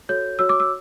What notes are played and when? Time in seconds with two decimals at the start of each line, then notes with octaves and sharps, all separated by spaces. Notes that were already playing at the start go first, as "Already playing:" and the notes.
0.09 F#4 A4 C#5 G6
0.39 F#4 C#5 E6
0.49 D6
0.60 E6